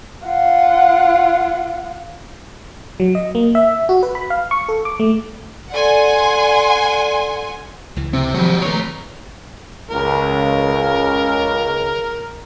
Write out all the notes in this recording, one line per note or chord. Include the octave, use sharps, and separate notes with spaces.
F4 F#5
F#3
D#5
A#3
E5
F#4
B4
B5
F5
C#6
A4
D6
A3
A4 D5 F#5 G#5 C6
C#2 E3
C3 C4
D#3 F3 F#3 G#3 G4
D#3 E3 A3 B4 C#5 A#5
C#2 A#4